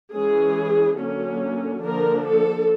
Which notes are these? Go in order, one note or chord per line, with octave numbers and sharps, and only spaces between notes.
E3 G#3 C#4 G#4
D3 F#3 A#3 C#4
D3 F3 A#3 D4 A#4
A4